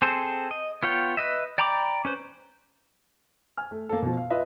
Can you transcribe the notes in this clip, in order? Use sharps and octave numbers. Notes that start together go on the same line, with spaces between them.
C4 G#4 A4 C5
D#5
B3 F4 C#5 G5
B4 D#5 E5
D5 G5 A#5 B5 D6
C#4 B4 C5
G#5 F6
A3
A#3 A4
B2 F3
F5
F4 B4 D#5 E5